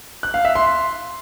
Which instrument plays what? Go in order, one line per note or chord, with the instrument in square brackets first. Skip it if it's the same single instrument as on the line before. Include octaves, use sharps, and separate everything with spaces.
[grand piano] F#6
F5
E5
C6